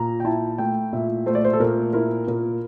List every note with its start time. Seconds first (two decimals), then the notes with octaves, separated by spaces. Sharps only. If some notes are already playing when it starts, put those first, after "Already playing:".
Already playing: A#2 A#5
0.20 G5
0.25 E4 A5
0.58 A3 G5
0.93 A#2 E5
1.26 A3 C5
1.35 D5
1.44 C5
1.53 A4
1.60 A#2 A#4
1.93 E4 A#4
2.27 A#2 A#4